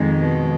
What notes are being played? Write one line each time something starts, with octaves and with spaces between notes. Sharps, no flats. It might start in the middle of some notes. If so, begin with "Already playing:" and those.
Already playing: F2 D#3 G#3
B2